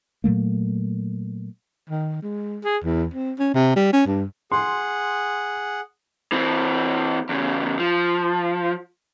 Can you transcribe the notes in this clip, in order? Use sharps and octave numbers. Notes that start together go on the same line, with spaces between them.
A#2 F#3 A3 A#3
D#3
G#3
G#4
E2
C4
C#4
C3
G3
C#4
G2
G#4 F#5 C6
E3 C4
E2 C#3
F3